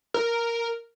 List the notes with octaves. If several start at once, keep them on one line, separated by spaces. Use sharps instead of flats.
A#4